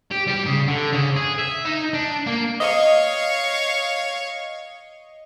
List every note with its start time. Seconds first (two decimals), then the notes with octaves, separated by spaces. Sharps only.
0.11 G4
0.27 G3
0.46 C#3
0.68 D3
0.93 C#3
1.16 G#4
1.38 E5
1.65 D#4
1.94 D4
2.26 A#3
2.60 C#5 D#5 F5